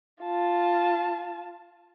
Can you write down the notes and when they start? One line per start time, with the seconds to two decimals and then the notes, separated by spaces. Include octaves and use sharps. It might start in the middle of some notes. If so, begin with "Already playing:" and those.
0.23 F4 A5